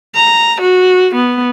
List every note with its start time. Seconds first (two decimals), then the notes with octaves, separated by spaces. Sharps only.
0.15 A#5
0.61 F#4
1.15 B3